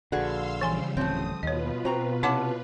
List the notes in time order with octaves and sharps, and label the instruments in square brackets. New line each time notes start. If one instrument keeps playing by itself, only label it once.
[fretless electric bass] A#1 D3 [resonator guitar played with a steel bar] F#4 G#4 B4 [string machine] F5 C6 E6
[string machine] C#3 F3 G3 [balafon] E3 G#5 C6
[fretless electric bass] D1 A1 C#4 [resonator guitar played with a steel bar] A3 C4 [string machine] D#6
[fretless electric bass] D#2 [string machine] B2 F4 B4 [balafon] C#5 D#5
[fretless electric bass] C4 [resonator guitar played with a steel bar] F#4 A#5
[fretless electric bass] C3 [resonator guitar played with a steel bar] C#4 F#5 A5 [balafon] E4 C#5 D6